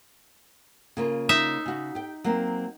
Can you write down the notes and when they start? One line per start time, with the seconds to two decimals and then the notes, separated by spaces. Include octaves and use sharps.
0.97 C#3 A#3 F4
1.29 D#4 E5
1.66 C#3 F#4
1.95 G4 G5
2.24 F#3 A#3 C4